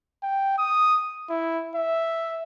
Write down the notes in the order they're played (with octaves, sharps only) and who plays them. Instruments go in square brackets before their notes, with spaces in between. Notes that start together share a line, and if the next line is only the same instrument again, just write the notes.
[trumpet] G5
D#6
E4
E5